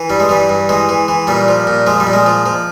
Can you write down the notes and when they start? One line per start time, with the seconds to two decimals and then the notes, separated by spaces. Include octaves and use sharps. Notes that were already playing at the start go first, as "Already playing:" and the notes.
Already playing: E3
0.10 G2 G3
0.20 G#3
0.29 E3 G3
0.49 G2
0.69 E3 G#3
0.89 E3
1.08 E3
1.27 A#2 G3
1.48 F3
1.67 A#2
1.87 F3 G#3
2.00 G3
2.07 A#2
2.13 G#3
2.26 F3
2.46 F3